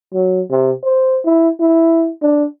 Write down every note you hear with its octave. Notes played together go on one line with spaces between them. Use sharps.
F#3
C3
C5
E4
E4
D4